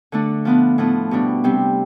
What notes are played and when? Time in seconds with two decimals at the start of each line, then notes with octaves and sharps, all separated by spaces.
0.12 D3 A3 D4
0.45 F3 B3 D4
0.78 A2 F3 B3 E4
1.11 B2 G3 D4
1.44 C3 G3 C4